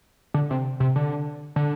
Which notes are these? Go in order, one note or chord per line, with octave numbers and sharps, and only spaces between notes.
D3
C3
C3
D3
D3